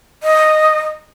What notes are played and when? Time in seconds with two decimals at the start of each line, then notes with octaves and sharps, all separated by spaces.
0.23 D#5